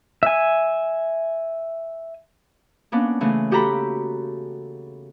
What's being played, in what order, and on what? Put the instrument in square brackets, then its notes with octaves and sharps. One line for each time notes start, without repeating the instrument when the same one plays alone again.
[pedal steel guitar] E5 G#5
[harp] A#3 B3 C#4 D4
C#3 E3 A3 A#3
F#4 G4 A4 G5 A#5 B5